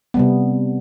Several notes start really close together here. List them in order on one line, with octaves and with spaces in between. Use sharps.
B3 G3 C3